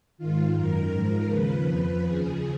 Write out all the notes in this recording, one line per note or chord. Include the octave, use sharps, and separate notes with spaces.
G#2 D#3 F4
F#2 D#3 A#4
G#2 F3 A#4
D#2 C#3 F3 B4
F2 F3
D#2 C#3 F3 G#4